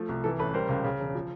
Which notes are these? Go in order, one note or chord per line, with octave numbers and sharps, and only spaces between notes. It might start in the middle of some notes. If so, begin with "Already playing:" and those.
Already playing: F3 A3
C2
E3 A4
A1 A4 B4
G3 A#4 C5
C#2
C#3
E1
F3